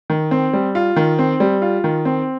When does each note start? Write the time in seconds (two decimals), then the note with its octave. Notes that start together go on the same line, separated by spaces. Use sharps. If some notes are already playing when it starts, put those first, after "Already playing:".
0.10 D#3
0.31 C4
0.53 G3
0.75 F4
0.96 D#3
1.19 C4
1.40 G3
1.62 F4
1.84 D#3
2.05 C4